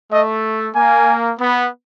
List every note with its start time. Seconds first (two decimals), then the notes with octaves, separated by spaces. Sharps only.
0.12 A3 D#5
0.75 A#3 G#5
1.39 B3